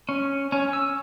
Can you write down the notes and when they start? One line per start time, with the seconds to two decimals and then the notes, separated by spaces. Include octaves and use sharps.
0.09 C#4
0.52 C#4
0.73 E6